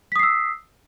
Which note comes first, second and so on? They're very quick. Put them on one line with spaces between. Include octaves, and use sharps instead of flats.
B6 D#6 C7 E6